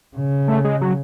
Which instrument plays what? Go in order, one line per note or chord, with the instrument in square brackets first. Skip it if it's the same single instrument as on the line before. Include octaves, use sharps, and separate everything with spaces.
[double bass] C#3
[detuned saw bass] A3
G#3
F#3